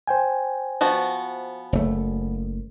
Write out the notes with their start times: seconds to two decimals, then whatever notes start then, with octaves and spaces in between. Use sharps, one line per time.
0.07 C5 G5 G#5
0.81 F3 B3 F#4
1.73 F#1 A3